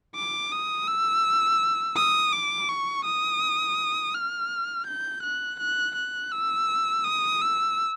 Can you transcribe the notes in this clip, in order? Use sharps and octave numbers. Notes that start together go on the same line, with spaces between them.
D6
D#6
E6
D#6
D6
C#6
D#6
F6
G6
F#6
F#6
F#6
E6
D#6
E6